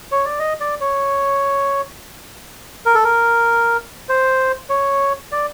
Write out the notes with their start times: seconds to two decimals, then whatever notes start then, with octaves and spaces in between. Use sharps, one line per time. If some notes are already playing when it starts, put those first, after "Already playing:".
0.12 C#5
0.25 D5
0.39 D#5
0.60 D5
0.81 C#5
2.86 A#4
2.95 A4
3.04 A#4
4.09 C5
4.70 C#5
5.32 D5